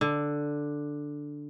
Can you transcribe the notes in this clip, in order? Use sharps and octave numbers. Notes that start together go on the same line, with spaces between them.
D3